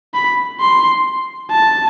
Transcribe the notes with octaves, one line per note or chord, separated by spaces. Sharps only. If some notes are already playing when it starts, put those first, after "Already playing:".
B5
C6
A5